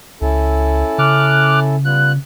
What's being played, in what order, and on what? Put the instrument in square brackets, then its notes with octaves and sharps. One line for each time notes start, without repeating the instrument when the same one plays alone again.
[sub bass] C#2 [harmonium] C#4 E4 A4
[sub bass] C#3 [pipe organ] D6 F6 F#6
[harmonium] G3 B3 F4 [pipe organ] F#6